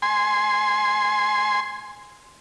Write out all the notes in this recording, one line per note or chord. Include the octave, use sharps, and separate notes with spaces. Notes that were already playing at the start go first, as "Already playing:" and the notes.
G#5 C6